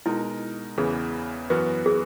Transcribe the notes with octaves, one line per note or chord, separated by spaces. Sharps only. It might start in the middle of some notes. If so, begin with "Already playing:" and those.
B2 G#3 D#4 E4 A#4
E2 C#3 E3 B3 E4 G#4
F#2 E3 B3 F#4 B4
G#4